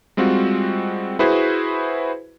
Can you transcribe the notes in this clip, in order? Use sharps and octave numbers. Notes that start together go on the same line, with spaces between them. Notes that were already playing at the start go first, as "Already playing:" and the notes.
G3 G#3 C4 F4 F#4
E4 F#4 G#4 B4 C5